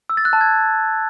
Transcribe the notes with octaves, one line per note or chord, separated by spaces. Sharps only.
E6
A6
F#6
A5
G#6